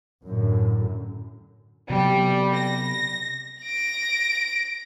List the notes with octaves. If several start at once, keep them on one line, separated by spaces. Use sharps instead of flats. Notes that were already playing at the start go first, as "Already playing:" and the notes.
F#2 A2 D3
C3 F#3 G3 B3
A#6
A#6 D7